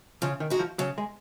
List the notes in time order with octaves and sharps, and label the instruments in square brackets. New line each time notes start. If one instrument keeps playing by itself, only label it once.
[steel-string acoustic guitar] C#3 [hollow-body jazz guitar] F3
[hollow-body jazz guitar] D#3
[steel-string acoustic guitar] G#3 D#4 F#4
[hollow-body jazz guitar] F3
[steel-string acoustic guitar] C#3 [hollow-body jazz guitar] F#3
[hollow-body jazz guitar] G#3